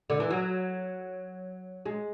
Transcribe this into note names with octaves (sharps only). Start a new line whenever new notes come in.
D3
E3
F#3
G#3